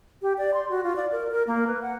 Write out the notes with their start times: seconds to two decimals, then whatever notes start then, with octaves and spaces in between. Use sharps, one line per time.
0.22 G4
0.38 D5
0.54 C6
0.70 F#4
0.84 F4
0.96 D5
1.12 A#4
1.31 A#4
1.47 A#3
1.67 B4
1.82 F#5